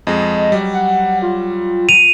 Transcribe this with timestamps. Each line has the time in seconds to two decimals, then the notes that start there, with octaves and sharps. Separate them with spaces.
0.07 F2 G#3 D#5
0.52 F#3 G3
0.74 F#5
1.22 F4
1.89 D#7 F7